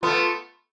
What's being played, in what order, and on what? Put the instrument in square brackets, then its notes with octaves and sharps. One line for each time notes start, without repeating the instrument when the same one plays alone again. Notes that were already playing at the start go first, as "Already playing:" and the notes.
[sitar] A3 B3 [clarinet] F4